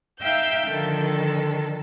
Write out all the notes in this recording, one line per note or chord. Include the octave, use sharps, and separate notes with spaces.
D#4 E5 F5 G5 E6 G6
D3 D#3 F3 A4